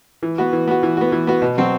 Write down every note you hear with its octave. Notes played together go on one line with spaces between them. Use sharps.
E3
B3 F#4
E3
B3 F#4
E3
B3 F#4
E3
B3 F#4
B2
F#3 C4 F#4